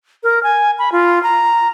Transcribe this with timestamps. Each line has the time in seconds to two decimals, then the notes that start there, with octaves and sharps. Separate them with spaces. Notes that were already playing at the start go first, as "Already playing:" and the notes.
0.23 A#4
0.43 G#5
0.79 B5
0.92 F4
1.23 A#5